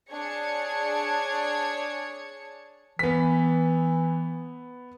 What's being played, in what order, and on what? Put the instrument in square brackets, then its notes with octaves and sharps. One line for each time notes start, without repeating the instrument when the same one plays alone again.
[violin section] D4 G#4 C#5 A5 G#6 C#7
[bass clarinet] E3 [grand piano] B3 B6